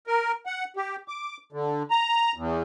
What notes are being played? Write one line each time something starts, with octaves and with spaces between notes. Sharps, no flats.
A#4
F#5
G4
D6
D3
A#5
E2